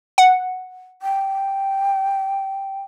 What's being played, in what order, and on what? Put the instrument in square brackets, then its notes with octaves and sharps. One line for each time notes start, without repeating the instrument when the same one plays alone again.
[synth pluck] F#5
[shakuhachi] G5